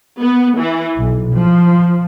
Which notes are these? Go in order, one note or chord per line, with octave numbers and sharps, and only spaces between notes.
B3
E3
B1
F3